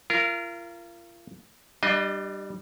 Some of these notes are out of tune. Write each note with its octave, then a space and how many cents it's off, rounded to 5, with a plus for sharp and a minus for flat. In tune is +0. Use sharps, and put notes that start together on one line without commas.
F4 -35 A#4 -10
G3 -10 D4 +30 D#5 +0